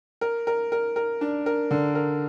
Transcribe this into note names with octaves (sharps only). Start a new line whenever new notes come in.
A#4
A#4
A#4
A#4
D4
A#4
D3
A#4